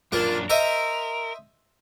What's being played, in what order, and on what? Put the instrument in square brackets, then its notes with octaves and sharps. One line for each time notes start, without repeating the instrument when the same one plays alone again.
[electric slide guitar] F#2 A#2 D4 [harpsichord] A#3 F4
[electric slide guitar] A#4 [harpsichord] C5 D#5 E5